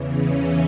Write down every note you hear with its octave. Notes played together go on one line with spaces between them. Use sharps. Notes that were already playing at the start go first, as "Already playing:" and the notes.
Already playing: E2 C#3 E3
C#4